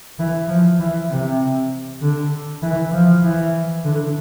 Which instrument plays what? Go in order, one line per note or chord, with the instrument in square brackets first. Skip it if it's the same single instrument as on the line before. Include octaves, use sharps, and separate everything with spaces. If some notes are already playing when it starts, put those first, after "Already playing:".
[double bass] E3
F3
E3
C3
D3
E3
F3
E3
D3